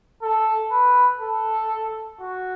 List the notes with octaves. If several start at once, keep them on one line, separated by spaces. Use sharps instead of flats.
A4
B4
A4
F#4